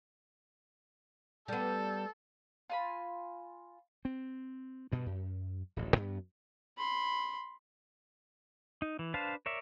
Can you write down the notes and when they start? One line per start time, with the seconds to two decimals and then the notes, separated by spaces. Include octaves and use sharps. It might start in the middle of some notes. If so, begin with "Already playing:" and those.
1.48 G3 B3 A4
2.70 F4 G#5 B5
4.05 C4
4.92 G2 B2
5.06 F#2
5.76 D1 A1 D2
5.96 F#2 B3
6.78 B5 C6
8.82 D#4
8.99 E3
9.14 D4 B4 C5 F5 A5
9.46 A#4 C#5 D5 E5